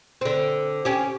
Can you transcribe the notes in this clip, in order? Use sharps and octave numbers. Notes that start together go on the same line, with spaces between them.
D3 C4
C#4 G4